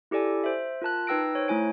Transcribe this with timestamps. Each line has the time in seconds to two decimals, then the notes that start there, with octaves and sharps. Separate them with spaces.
0.11 E4 G4 A4 D5 G#5
0.44 C5 E5
0.82 F4 A#4 A5 F#6
1.07 D#4 B4 G5 E6 A#6 D7
1.35 C5 C#5
1.48 A3 E4 G#5 D7